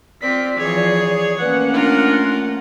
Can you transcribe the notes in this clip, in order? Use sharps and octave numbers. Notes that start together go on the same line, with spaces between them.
C4 F4 D5 B6
E3 F3 G#4 C#5
A3 A#3 C#4 B4 F#5
D4 F4 A#4